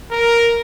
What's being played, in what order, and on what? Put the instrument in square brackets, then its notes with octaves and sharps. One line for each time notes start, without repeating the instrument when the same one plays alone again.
[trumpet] A#4